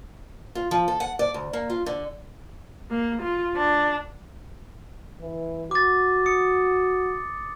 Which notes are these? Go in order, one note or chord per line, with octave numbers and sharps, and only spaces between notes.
F4
F3
A4
F#5
D5
D2
A#3
F4
D3
A#3
F4
D4
E3
F#4 D6 A6
D#6 C#7